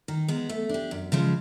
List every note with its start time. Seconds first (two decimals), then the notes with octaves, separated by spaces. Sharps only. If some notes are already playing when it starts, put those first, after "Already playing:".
0.08 D#3
0.28 G#3 B3
0.49 A3
0.69 D4 G4
0.91 F#2
1.12 C#3 F3 G#3